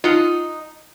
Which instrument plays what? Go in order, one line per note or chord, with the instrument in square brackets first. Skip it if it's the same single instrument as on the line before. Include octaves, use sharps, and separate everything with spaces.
[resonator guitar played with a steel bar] D#4 [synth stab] F4 F#5